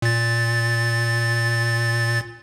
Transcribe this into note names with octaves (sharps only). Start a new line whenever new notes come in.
A#2 A6